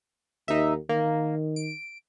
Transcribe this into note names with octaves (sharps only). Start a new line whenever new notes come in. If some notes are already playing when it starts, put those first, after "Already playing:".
D#2 D#4 E5
D#3 A#3
D7